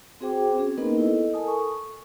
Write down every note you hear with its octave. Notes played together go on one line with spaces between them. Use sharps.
C4 F#4 G#4 C5 G5 D6
C4 C#4 G#4
A#3 B3 D#4 A#4 B4 D#5
E4 A4 D#5
A4 A#4 G#5 A5 D#6
C#6